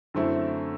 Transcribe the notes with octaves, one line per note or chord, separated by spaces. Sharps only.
F#2 D3 A3 C4 E4